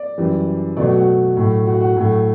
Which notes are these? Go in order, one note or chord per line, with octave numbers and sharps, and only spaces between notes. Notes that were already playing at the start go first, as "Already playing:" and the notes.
Already playing: D5
F#2 E3 G3
B2 F#3 A3 D5
F#4
F#4
A2 F#3 A3
F#4
F#4
A2 F#3 A3